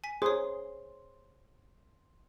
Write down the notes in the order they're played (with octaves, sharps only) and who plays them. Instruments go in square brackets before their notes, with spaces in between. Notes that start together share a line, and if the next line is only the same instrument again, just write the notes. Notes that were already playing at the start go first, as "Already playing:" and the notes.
[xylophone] G#5 B6
[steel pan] G#4 [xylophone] C5 C#5 [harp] C6